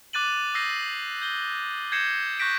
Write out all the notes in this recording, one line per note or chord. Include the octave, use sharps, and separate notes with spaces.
D6 F#6 A6 D#7 F#7
D#6 E6 G6 A#6 C7 D#7
G6 G7
G6 G#6 A#6 C7 C#7 E7
C#6 F#6 G6 A#6 B6 D7